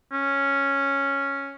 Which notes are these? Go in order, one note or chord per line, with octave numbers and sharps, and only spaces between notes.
C#4